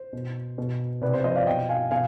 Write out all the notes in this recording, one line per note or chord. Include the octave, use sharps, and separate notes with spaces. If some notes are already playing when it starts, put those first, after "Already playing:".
Already playing: C5
B2
B2
C3 B4 D5
C5
F3 C5 D#5
D5 F5
B2 D#5 G5
F5 G#5
B2 F5 G#5